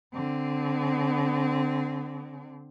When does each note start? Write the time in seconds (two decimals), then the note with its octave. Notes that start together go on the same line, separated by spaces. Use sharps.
0.13 D3 C4